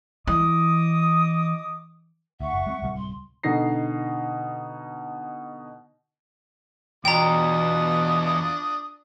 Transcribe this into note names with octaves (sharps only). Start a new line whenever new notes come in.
E3 D#5 D6 D#6
D2 E5 F#5 C#6
F#1
G#3 A#3 C4
D1 C3 G3
C6
B2 D3 D#4 A#6 C7
E2 B2 D4 F4 G5 A#5 D#6